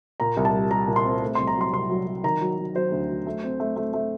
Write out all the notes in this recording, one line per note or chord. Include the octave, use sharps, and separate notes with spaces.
A#2 A#5
C2
A5
G3
G3 A#5
A#2
C6
C4
A3
C6
C2
A#5
F#3 C6
C2 C6
F#3
F#3
D#3 A#5
F#3
F#3
F#3 C5
D2
F#3
A3
C4
A3
A3
A3